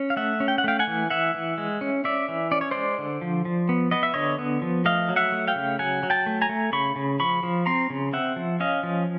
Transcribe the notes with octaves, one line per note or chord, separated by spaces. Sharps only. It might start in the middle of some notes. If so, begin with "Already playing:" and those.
Already playing: C#4
F5
A3 E5 F#5
C#4
G5
F#5
A3 F5 G5
F#5 G#5
E3
E3 E5 F#5
E3
G#3
C#4
C#4 D5 E5
E3
C#4 D5
C#5
G#3 C5 D5
D3
F3
F3
B3
B3 D#5
E5
D3 C#5 D#5
B3
F3
A3 D#5 F5
F#3
E5 F#5
A3
F5 G5
C#3
F#3 F#5 G#5
F#3
G5 A5
A3
G#5 A#5
A3
C#3 B5 C#6
C#3
F3 B5 C#6
F3
C4 A#5 C6
C#3
C4 E5 F#5
F3
C#4 D#5 F5
F3